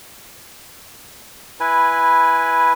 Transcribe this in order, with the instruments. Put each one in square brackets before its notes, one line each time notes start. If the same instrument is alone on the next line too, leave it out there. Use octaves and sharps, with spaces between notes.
[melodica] E4 B4 G#5